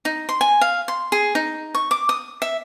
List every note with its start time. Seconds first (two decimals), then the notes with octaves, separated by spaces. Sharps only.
0.05 D#4
0.29 C6
0.41 G#5
0.61 F5
0.88 C6
1.12 G#4
1.35 D#4
1.75 C#6
1.91 D6
2.09 D#6
2.42 E5